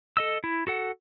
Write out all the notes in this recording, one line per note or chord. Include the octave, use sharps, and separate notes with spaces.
A4 D#5 E6
E4
F#4 A4 F#5